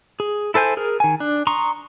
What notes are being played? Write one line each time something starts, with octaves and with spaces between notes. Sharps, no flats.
G#4
E4 A4 C5 G#5 G6
G#4 A#4
D#3 G#5
D4
A#5 C6 C#6 D#6